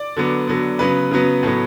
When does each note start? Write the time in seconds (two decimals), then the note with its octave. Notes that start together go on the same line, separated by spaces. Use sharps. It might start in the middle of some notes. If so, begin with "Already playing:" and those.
Already playing: D5
0.16 D3 F#3 B3
0.47 D3 F#3 B3
0.79 C#3 F#3 B3 B4
1.11 C#3 F#3 B3
1.43 A2 F#3 B3